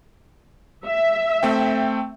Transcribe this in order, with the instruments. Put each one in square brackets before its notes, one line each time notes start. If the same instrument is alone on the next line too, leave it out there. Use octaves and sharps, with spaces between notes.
[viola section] E5
[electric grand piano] A3 C4 G5